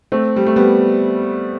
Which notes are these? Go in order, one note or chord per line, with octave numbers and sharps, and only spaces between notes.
A3 C4
G3
A3
G3 B3